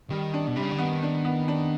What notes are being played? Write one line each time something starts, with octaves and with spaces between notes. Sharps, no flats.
D#3 G3
D4
B2
C3 G3
C#3
D3
D#3 B3
D4
B3
D4